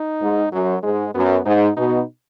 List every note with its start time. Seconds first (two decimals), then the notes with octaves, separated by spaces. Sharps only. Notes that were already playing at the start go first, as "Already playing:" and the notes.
Already playing: D#4
0.21 G#2
0.52 F#2 F#3
0.83 G#2 G#3
1.14 F#2 B3
1.45 G#2 D#4
1.76 B2 D#4